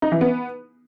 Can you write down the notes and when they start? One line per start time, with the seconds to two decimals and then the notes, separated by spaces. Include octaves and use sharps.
0.02 D#4
0.12 E3
0.21 B3